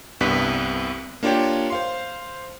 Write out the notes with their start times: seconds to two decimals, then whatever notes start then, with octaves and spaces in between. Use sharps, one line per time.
0.21 C2 G2 C3 B3 F#6 B6
1.23 A#3 D4 F4 G4 C#5 G5
1.70 C5 F5 C6